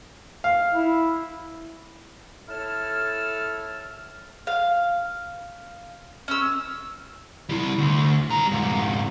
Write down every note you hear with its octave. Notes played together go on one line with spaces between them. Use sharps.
F5
E4
E4 A4 C#5 A5 E6 F6
F5
C#4 E6
G3 E4
D2
G3 A#5
F2 G#2